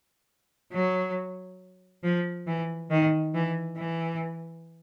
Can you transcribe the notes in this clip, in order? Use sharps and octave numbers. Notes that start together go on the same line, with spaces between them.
F#3
F3
E3
D#3
E3
E3